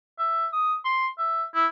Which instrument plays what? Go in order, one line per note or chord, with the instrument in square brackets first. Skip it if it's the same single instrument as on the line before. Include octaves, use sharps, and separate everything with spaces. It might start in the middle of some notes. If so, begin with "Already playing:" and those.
[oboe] E5
D#6
C6
E5
E4